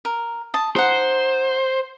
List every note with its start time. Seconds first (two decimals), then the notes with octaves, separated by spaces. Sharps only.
0.05 A#4
0.54 A5 D#6
0.76 D#4 C5 F#5